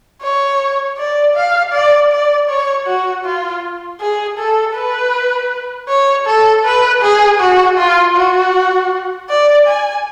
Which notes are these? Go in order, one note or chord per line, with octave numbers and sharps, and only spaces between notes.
C#5
D5
F5
D5
D5
C#5
F#4
F4
G#4
A4
B4
C#5
A4
B4
G#4
F#4
F4
F#4
D5
G#5